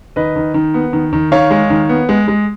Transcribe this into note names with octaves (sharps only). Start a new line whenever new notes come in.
D#3 B4 D#5
D#3
D#3
B3
D#3
D#3
D#3 C#5 F5
G#3
D#3
B3
G#3
G#3